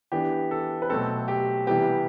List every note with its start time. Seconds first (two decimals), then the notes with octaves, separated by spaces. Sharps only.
0.12 E3 B3 D4 G4
0.51 A4
0.82 B4
0.89 B2 F#3 A3 C4 A4
1.28 G4
1.67 C3 E3 G3 B3 G4